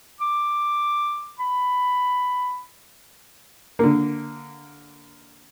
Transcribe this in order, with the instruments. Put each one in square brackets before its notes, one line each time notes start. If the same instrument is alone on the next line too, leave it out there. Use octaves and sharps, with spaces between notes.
[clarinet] D6
B5
[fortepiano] D3 A#3